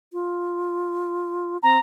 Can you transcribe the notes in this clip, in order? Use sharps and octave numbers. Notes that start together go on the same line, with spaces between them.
F4
C4 A#5